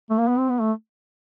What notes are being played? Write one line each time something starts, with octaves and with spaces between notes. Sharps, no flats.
A3
A#3
B3
C4
B3
A3